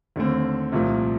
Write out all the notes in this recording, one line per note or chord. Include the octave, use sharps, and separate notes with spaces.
D#2 D3 A3 C4
C2 A#2 F3 A3